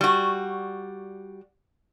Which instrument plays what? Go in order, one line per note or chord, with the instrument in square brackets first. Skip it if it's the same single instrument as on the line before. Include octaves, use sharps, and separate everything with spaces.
[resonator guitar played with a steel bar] G3 F#4